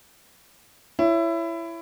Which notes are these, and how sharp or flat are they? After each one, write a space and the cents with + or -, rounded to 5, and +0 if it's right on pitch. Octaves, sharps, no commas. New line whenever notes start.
E4 +20 C#5 +5